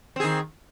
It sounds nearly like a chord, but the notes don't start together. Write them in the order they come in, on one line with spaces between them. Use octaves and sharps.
C4 G#4 D#3